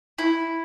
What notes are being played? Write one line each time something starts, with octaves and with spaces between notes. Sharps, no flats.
E4